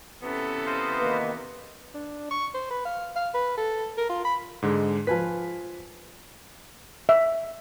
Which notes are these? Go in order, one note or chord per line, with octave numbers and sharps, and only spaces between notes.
C3 E3 B3 C#4 A4
C5 D#5 F5
D#3 A#3 B4
D4
C#6
C5
B4
F5
F5
B4
A4
A#4
F4
B5
G#2 D3 G#3
F3 B4 G#5 B6
E5